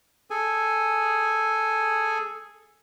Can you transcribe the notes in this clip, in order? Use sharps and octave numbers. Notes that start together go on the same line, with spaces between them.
G#4 A4 G#5